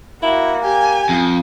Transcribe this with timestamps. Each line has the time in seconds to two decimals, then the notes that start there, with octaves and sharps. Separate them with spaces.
0.22 A#3 E4 F#4
0.64 G4 G#5
1.09 F2